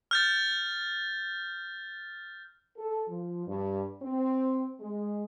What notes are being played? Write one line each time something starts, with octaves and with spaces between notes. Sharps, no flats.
F6 G6 A6
A4
F3
G2
C4
G#3